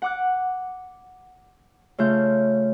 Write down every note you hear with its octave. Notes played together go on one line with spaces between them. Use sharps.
F#5 D6 F#6
C#3 A3 F4 G6